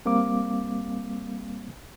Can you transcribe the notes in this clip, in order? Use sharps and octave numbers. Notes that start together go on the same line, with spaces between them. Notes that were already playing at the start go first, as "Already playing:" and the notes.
G3 A#3 C4 F5 D6